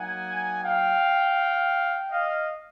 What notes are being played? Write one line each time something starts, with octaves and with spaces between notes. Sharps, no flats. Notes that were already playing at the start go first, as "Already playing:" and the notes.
Already playing: F#3 A#3 D#4 F#5 G#5
F5 G5
D#5 F5